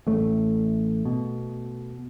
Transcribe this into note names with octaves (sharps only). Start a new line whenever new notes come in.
A1 A2 A3
B2